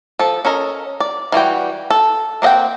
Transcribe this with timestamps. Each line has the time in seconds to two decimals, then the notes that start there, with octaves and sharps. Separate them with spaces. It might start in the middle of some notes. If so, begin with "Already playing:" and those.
0.19 F3 A4
0.45 C#4 A4 A#4 D#5
1.00 D5
1.32 E3 G3 F#4 G5
1.90 A4
2.42 A#3 C4 D#5 F#5 G5